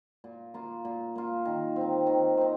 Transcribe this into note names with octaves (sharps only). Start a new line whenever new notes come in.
A#2
A#3 F4
A#2
A#3 F4
D#3
C4 D#4
D#3
C4 D#4